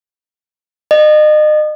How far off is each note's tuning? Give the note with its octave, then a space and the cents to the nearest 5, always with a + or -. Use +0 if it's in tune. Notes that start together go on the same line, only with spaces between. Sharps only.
D#5 -35